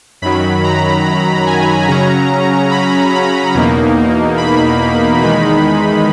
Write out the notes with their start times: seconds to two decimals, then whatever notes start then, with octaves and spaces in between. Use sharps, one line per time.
0.22 F#2 D#3 F#3 B5
0.64 A#5
1.47 G#5
1.88 C#3 F#3 C#4 A#5
2.71 B5
3.12 B5
3.54 E2 B2 A#3 D#4
4.38 B5
5.21 E2 D#3 G#3 D#4 B5